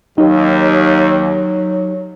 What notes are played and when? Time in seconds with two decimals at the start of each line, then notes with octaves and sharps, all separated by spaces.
0.18 D#2 F#3 D#4 G4